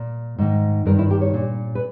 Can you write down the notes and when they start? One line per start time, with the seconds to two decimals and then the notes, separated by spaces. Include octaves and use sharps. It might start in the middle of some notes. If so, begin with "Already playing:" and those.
Already playing: A#2
0.38 G#2 D#3
0.86 G2 D#3 A#4
0.99 E4
1.10 G4
1.21 C#5
1.34 A#2
1.75 B4